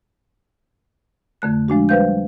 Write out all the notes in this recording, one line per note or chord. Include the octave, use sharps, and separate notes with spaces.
F2 D3 A3 F#6
F3 G#3 D4 F#4
G3 B4 C5 F5 G6